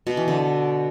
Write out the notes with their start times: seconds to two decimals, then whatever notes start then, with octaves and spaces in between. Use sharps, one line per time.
0.07 B2
0.17 E3
0.28 D3